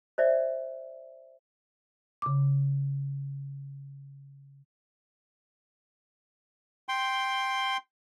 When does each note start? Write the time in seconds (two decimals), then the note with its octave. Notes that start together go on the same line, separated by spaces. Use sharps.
0.18 C5 D5 E5
2.22 C#3 D6
6.89 G5 C6